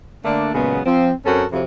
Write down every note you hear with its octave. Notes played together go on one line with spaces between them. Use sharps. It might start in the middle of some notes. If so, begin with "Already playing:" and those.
D3 A3 A#3 D4
A#2 C#3 F#3 G#3 B3
F3 C4
F#2 C4 C#4 F#4 A4 A#4
F2 C3 F#3